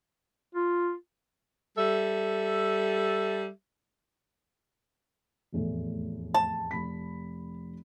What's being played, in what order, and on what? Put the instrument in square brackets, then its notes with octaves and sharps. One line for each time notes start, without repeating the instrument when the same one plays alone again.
[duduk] F4
[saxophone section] G3 A4 E5
[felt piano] F1 E2 A2
[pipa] A5
[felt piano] F1 B5 B6